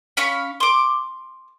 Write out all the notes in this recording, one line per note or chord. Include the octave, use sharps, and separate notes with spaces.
C#4 F5 B5 C#6
C6 D6